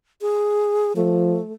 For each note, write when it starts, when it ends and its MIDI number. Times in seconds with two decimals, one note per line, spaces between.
0.21 0.93 68
0.96 1.39 53
0.96 1.53 57